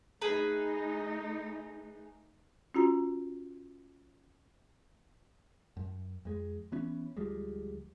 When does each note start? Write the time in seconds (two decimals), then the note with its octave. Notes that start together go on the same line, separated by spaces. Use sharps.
0.22 A3 D#4 G#4 B4
2.74 C#4 F4 F#4 A#5
5.77 F#2
6.25 F2 G#3
6.72 E3 B3 C#4
7.17 D2 F3 G3 G#3